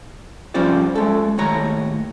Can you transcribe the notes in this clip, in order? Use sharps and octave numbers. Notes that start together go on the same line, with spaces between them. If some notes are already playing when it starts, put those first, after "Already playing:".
F3 G3 C#4 F4 C5 D5
G#3 A4
D#2 A2 C#5 A#5